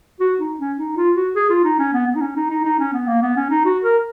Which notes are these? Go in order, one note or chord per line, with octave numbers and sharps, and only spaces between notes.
F#4
D#4
C#4
D#4
F4
F#4
G#4
F4
D#4
C#4
B3
B3
D#4
C#4
D#4
D#4
D#4
C#4
B3
A#3
B3
C#4
D#4
F#4
A#4